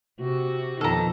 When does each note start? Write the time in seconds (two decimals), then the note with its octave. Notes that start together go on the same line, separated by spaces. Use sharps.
0.20 C3 F#4
0.81 F2 B2 D#3 A4 A#5